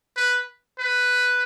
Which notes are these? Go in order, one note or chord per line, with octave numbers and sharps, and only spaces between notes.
B4
B4